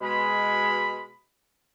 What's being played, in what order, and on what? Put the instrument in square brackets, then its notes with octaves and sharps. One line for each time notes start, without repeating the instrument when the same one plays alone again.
[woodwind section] B2 G#3 B5